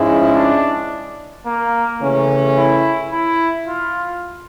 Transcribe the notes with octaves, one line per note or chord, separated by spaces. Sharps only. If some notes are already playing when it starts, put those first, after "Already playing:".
Already playing: G#2 F3 G#3 C#4 E4
D4
A#3
C#3 E3 A3 C#4
E4
E4
F4